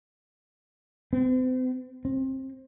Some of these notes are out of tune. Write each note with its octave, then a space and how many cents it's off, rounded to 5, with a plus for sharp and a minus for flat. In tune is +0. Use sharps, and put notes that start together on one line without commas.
C4 -40
C4 +25